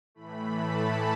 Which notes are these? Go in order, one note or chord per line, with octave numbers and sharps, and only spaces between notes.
A2 E3 A3 B5
A5